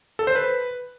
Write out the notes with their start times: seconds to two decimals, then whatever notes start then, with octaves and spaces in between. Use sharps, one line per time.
0.19 A4
0.27 C5
0.35 B4